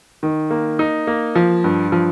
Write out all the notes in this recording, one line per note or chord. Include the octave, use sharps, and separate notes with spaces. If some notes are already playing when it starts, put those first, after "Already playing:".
D#3
A#3
D#4
A#3
F3
G2
F3